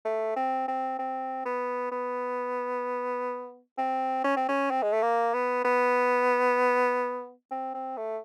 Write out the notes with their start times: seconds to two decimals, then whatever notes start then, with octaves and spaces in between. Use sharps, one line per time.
0.05 A3
0.36 C4
0.68 C4
0.99 C4
1.45 B3
1.92 B3
3.78 C4
4.24 C#4
4.37 C4
4.49 C#4
4.71 C4
4.83 G#3
4.93 A3
5.02 A#3
5.34 B3
5.65 B3
7.51 C4
7.74 C4
7.97 A3